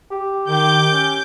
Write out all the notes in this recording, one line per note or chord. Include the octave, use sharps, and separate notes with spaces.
G4
D#3 D6 G6
C#4